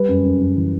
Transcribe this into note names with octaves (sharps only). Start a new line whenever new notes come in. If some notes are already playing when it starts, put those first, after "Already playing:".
Already playing: G3 B4
F#2
F#2
F#2
E3